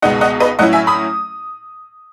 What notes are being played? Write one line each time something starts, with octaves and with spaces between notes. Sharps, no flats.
C#2 B2 G#3 B3 D#4 D#5 F#5
D#5 F#5
B4 D#5
A2 F#3 C#4 E4 D#5 F#5
E5 G#5
B5 D#6